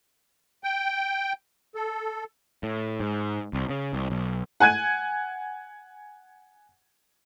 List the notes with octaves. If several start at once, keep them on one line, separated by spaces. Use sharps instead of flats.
G5
A4
A2
G#2
C2
C#3
C2
B1
F#5 G#5 F#6 G#6 D#7